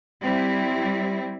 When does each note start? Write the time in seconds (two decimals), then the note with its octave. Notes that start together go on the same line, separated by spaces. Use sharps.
0.23 G3 C4 E4